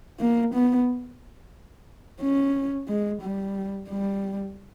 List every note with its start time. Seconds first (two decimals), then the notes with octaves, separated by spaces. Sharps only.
0.20 A#3
0.54 B3
2.21 C#4
2.88 G#3
3.22 G3
3.89 G3